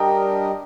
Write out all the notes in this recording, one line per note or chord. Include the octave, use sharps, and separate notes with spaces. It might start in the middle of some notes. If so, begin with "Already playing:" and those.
Already playing: G3 D4 G4 A#4 D#5 G5 A#5